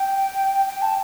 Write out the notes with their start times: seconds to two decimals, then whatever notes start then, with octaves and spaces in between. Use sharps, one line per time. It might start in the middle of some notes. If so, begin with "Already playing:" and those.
Already playing: G5
0.69 G5
0.82 A5